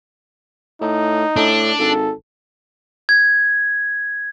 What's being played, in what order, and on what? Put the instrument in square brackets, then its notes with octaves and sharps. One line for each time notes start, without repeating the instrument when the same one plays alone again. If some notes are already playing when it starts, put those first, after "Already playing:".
[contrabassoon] A2 [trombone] D#4
[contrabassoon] A2 [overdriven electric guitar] D4
[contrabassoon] G#1 [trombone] A4
[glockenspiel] G#6